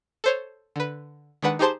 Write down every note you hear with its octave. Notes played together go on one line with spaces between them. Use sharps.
A4 C5 C#5
D3 B4
D#3 G#3 D4 B4 F#5
D#4 G4 G#4 C5 A5 C6